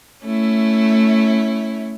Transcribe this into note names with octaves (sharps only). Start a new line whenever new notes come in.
A3 C#4 E4